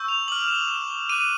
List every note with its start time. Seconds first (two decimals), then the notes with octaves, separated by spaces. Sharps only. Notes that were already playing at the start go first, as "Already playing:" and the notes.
Already playing: C#6 E6 G6
0.08 F7
0.28 D6 F6 F#7
0.48 E7
0.68 E7
1.09 D6 F#6 D#7